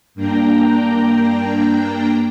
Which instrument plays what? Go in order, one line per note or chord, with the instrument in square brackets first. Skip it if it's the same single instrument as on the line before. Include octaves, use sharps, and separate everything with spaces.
[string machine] G2 A#3 D4 G5 A#5